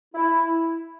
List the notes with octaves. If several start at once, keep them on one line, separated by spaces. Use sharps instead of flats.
E4